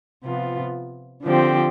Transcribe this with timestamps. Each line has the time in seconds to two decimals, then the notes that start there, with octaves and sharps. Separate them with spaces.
0.24 C3 F3 B3 F4
1.23 D3 F3 C4 G4